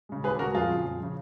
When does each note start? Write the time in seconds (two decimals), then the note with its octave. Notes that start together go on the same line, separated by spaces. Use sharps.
0.09 C#3 G#3
0.24 D#2 G#4 B4
0.39 C#3 G#3 F#4 A#4
0.55 F2 F4 G#4
0.70 C#3 F3
0.85 F2
1.00 C#3 F3